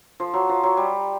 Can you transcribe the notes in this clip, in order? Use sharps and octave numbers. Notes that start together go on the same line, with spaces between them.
F3
F#3
F3
F#3
G3